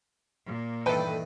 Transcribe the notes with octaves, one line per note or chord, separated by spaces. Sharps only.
A#2 A#3
G2 D#3 E3 A4 B4 G5